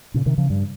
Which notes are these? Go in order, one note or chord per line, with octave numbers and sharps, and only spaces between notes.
A#2 C#3
C3 D#3
C#3 F3
G2